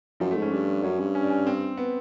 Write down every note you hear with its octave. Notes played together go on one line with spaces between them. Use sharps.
F#2 F3
A3
G#2
C#4
G2 D4
F#2 C#4
G2
C#4
D4
C#4
C4
B3